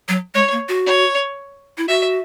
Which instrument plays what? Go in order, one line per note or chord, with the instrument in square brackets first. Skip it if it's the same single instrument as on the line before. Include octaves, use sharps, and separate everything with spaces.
[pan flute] F#3
[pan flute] G#3 [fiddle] C#5
[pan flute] A#3
F#4
[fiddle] C#5
[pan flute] E4
[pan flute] F#4 [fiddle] E5